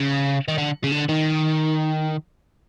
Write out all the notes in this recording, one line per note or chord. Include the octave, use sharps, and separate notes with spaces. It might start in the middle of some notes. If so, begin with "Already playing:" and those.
Already playing: C#3
D#3
D3
C#3
D3
D#3